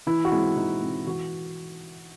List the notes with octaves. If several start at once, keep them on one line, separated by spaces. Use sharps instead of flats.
E3 E4
F#4
G#3 C4 E4
E3 D#4
G#3 C4
E3 F#4